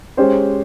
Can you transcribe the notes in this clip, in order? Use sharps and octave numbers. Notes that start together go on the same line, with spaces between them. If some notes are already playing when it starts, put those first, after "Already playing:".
G#3 C#4 G4 C5